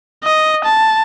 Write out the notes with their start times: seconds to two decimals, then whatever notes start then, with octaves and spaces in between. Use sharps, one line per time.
0.24 D#5
0.65 A5